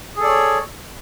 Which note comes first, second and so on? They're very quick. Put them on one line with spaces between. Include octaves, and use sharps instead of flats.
G#4 A4 D5 C#5